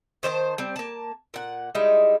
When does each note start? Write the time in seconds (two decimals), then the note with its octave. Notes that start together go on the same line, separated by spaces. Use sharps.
0.23 D#3 C5 D#5 A5
0.58 G3 C4
0.76 A#3 A5
1.34 A#2 F#5
1.75 G3 G#3 D#4 E4